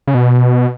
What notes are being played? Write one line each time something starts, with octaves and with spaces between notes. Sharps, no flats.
C#3
B2